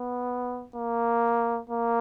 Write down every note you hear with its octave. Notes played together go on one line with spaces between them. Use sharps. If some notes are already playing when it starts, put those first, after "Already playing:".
Already playing: B3
A#3
A#3